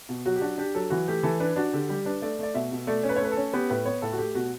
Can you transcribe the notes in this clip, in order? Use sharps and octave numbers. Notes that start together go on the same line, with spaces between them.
B2
F#3 F#4
G4
D4 F#4
D4 G4
F#3 A4
E3 F#4
A3 G4
E3 A4
D4 B4
D4 F#4
D3 G4
G3 G4
D4 B4
A3 D5
A3 D5
B2 E5
B2
A3 D5
C#4
B4
C#5
A3 B4
A4
C#4
B3 G4
A2 B4
B3 C#5
A2 A4
F#4
A3 G4
B2 F#4